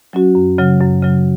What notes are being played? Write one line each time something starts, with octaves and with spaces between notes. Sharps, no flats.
F#3 C#4 F#4
F#2
C#3 F#3
F#2
C#3 F#3